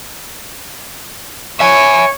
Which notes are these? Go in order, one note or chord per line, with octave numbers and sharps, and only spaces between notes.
C#5 E5 G#5